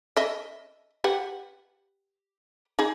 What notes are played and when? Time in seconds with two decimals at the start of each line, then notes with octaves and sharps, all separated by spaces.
0.17 D#5 E5
1.04 G4 B4 F#5
2.79 D#4 G#4